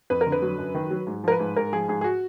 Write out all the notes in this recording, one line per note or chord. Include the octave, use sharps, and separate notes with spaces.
F2 B4
A#4
D3
B4
F#3
F#2
D#3
F#3
G#2
F3 A#4
B4
G#2
G#2 A#4
F3 G#4
G#2 G#4
G#4
F#4